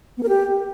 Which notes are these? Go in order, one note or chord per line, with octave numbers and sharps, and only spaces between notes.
B3
A#4
G4